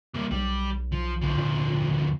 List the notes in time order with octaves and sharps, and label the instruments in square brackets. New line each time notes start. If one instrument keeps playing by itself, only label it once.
[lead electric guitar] G3 A#3
[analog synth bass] B1 [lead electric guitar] G3
[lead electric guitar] F3
D2 F3
[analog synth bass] A#2